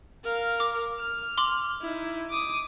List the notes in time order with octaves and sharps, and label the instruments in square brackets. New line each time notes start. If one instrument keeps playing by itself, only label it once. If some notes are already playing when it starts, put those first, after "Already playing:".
[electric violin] A#4 F5
[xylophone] D6
[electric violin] F6
[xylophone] C6 D6 F#7
[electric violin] D#4 E4
D6 D#6